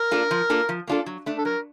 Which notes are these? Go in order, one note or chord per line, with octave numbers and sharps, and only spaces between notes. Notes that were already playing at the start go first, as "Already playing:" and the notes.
Already playing: A#4
A#3 D4 F4 A4
F3
A#3 D4 F4 A4
F3
A#3 D4 F4 A4
F#3
A3 D4
A4
F#3 A#4